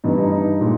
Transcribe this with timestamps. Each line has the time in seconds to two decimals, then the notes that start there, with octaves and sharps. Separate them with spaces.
0.04 G2 E3 G3 D#4
0.18 D#4
0.31 D#4
0.61 A#2 G#3